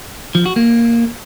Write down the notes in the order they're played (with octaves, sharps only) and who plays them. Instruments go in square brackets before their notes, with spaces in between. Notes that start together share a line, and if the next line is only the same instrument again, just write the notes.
[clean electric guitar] F3
F#4
A#3